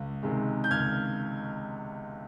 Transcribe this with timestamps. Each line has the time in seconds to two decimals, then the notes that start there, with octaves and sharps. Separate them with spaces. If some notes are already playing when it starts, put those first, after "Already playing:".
Already playing: C#2
0.23 C3 D#3 G#3
0.64 G6
0.71 C#2 F6 G#6